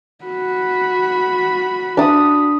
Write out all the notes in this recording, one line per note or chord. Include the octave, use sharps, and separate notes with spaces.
F#4 B5
D4 D#6